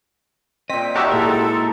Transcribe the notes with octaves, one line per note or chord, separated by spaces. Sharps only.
A#2 C4 D#5 G5 B6
D#4 F#4 G4 A#4 C#5 D5 E5 A5
A#2 G#3 E4 A4 A#4